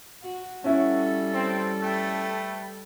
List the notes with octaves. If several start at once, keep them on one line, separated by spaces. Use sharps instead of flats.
F#4
G3 C#4 E4 F#4 A4
C4
A3 B4 G5